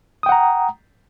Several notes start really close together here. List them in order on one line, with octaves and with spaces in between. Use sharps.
D#6 G5 F#5 A#5